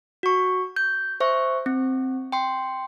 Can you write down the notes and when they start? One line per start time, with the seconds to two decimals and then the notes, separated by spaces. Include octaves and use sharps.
0.23 F#4 C#6
0.76 G6
1.20 C5 E5 C#6
1.66 C4
2.32 G5 C6